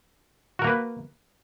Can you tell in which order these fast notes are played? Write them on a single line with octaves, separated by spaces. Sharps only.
F#4 A#4 A#3 B4